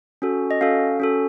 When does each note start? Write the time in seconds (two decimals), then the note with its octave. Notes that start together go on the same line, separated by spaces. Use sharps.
0.22 C#4 F#4 A4
0.51 D#5
0.61 C#4 F#4 A4 F5
1.00 C#4 F#4 A4